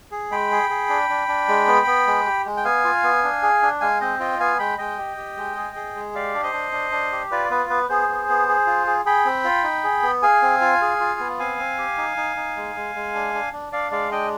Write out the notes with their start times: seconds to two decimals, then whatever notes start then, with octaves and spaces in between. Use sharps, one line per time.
0.11 G#4
0.31 G#3 G5 B5
0.51 G#4
0.70 G#4
0.89 D4
1.09 D4
1.28 D4
1.49 G#3
1.68 B3
1.87 B3
2.07 G#3
2.26 G4
2.46 G#3
2.57 G5
2.64 B3 F5 G#5
2.84 F4
3.03 B3
3.24 D4
3.43 G#4
3.62 D4
3.81 G#3 F5 G#5
4.01 C4 C5 D#5
4.20 F4 D#5 G5
4.40 B3 F5 G#5
4.59 G#3 G5 B5
4.78 G#3 D#5 G5
4.98 G4
5.17 G4
5.37 G#3
5.56 G#4
5.76 G#4
5.95 G#3
6.14 G4 D5 F5
6.34 D4
6.43 C5 D#5
6.53 D4
6.72 D4
6.92 D4
7.12 G4
7.31 F4 B4 D5
7.50 B3 B4
7.70 B3 B4
7.89 B3 G#4 C5
8.09 B3
8.29 B3
8.48 G#4
8.67 F4
8.87 G#4
9.06 G#4 G5 B5
9.25 C4
9.44 F4
9.64 D#4
9.84 G#4
10.03 B3
10.22 G#4 F5 G#5
10.42 C4
10.61 F4
10.81 G#4
11.00 F4
11.20 B3
11.39 C4 F5 G#5
11.59 C4
11.78 G4
11.98 D#4
12.17 D#4
12.36 D#4
12.56 G#3
12.76 G#3
12.95 G#3
13.14 D4
13.34 D4
13.53 D4
13.72 D4 D5 F5
13.91 G#3 D5 F5
14.11 D4 D#5 G5